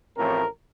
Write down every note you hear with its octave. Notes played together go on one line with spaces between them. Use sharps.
A1 A2 F3 A3 C4 A#4